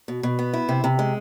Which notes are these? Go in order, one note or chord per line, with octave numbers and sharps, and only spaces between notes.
B2
B2
B3
E4
C3
C3
G#3